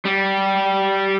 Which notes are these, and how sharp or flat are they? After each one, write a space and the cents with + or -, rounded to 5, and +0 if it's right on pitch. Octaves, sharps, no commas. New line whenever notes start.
G3 -15